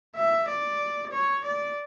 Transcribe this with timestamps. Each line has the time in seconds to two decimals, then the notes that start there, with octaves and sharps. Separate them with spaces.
0.16 E5
0.48 D5
1.12 C#5
1.44 D5